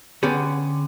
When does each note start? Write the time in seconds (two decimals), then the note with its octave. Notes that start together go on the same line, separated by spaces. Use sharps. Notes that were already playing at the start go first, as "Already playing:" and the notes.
0.23 D3 B3 C#4 G4 G#4